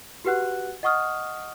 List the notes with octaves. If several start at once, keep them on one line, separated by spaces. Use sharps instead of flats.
F#4 G4 B4 F#5 F#6
D#5 F#5 C#6 D#6 F6